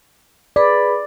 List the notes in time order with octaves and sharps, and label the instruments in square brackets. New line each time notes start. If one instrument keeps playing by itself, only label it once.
[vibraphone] G#4 B4 B5 [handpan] D5